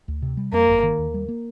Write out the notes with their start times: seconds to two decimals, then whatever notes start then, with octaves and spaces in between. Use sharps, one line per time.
0.08 D2
0.22 C3
0.37 G3
0.52 F2 A#3
0.68 G1
0.83 D#3
0.98 D#2
1.14 G3
1.29 A#3